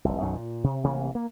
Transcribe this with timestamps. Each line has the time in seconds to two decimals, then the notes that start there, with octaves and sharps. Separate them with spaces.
0.05 F1 C2
0.20 B1 F#2 D#3 F#3
0.35 A#2
0.64 C3
0.84 A1 C3 E3 A#3
1.15 A#3